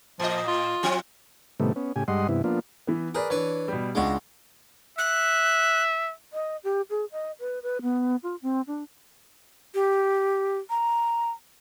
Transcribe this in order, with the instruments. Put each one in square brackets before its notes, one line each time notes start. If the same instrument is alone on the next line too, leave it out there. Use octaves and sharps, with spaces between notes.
[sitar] A2 D#5 [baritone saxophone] F3
[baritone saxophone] F4
[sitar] F3 C4
[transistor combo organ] A2 C3 D#3 G3 A3 B3
B3 C#4
A2 C#3 G4 G#5
G2 G3 G#3 D#5 F#5 C6
G2 C3 E3 B3 E4
F3 A#3 B3 D4 F4
[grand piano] E3 B3
[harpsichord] G#4 [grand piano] A#4 B4 D5
[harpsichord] E3 B4 [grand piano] D4 C#5
[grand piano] B2 G3
[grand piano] C#2 D4 [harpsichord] G#3 F#4
[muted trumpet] E5 [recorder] F#6
[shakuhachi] D#5
G4
G#4
D#5
B4
B4
B3
F4
C4
D4
[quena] G4
A#5